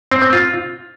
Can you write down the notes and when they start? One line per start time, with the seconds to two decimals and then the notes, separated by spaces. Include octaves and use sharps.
0.11 C4
0.22 C4
0.33 F4